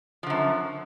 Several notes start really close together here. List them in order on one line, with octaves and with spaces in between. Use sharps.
F3 D3 F#2